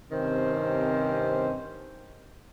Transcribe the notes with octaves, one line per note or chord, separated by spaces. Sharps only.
G2 C3 D#3 C4 C#4 C5